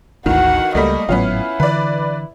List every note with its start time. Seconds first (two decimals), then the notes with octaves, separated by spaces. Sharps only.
0.26 G#1 D2 D#3 E3 F#4 F#5
0.75 C#2 G3 A3 A#3 D#5
1.09 G#1 A2 F#3 B3 C#4 E4 F4
1.60 D3 E3 B4 D5